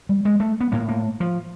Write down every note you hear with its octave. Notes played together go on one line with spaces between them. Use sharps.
G3
G#3
A3
B3
A2 A#3
A#3
F3